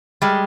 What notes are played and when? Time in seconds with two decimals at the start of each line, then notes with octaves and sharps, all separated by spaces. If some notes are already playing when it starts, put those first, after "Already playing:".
0.22 G3 G#3